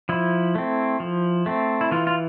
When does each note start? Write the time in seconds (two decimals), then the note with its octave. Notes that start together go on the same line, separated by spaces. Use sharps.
0.09 F3 E4
0.55 A3 C4
1.00 F3
1.46 A3 C4
1.81 E4
1.91 E3 F4
2.07 F4